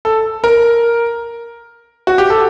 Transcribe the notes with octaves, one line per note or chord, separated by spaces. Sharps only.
A4
A#4
F#4
G4
A4